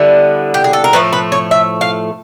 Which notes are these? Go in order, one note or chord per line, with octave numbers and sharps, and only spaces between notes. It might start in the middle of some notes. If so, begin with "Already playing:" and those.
Already playing: D3 G3 B3 E4
G4
G#4
A4
A#4
A2 F3 A3 B4
B4
C#5
E5
F5